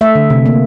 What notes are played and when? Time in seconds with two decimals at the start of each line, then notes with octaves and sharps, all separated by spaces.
0.01 A3 E5
0.15 D3
0.30 C3
0.46 A#3